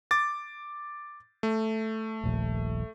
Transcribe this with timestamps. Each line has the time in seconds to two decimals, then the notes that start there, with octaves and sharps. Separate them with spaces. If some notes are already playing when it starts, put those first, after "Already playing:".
0.11 D6 A6
1.43 A3
2.24 D#1 A#1